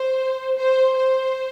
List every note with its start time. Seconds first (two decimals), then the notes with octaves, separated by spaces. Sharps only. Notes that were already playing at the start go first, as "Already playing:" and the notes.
Already playing: C5
0.57 C5
0.97 C5